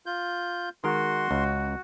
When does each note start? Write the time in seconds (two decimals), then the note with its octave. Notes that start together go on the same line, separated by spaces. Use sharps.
0.06 F4 G6
0.84 D#3 G#3 F#4 A#4 C6
1.31 C#2